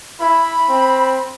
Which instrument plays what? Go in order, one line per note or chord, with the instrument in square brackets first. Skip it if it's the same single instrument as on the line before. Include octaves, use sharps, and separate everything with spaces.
[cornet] E4 [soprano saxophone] B5
[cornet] C4